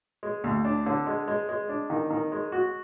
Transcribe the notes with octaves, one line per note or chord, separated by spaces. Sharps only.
G#3
D2
D4
D3
G#3
G#3
G#3
D4
D#3
D#3
G#3
F#4